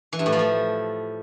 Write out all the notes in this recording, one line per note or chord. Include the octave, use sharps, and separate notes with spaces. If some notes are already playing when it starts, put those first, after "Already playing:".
E3
G2
A2
F3
A3